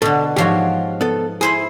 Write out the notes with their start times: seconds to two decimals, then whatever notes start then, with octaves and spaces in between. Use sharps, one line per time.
0.02 B2 D3 A4
0.36 G#2 F3 F#4 G4 C#5
1.01 B3 A4
1.41 E4 G#4 C5 B5